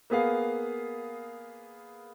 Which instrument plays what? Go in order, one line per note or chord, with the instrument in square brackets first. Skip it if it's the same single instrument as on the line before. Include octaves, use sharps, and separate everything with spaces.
[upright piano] A#3 B3 G#4 F5